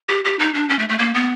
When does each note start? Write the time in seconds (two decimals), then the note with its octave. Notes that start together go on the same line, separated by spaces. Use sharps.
0.09 G4
0.25 G4
0.39 D#4
0.54 D4
0.69 C#4
0.79 A3
0.89 A3
0.99 A#3
1.14 B3